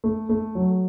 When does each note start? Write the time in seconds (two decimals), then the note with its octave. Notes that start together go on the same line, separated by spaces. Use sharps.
0.04 A3
0.29 A3
0.55 F#3